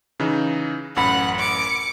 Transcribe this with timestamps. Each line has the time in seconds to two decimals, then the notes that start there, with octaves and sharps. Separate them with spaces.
0.20 C#3 E3 D#4
0.96 A1 F#2 F#5 B5
1.39 D6 C#7